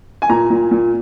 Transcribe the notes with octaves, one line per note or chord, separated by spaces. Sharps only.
G#5
A#2 A#5
A#2
A#2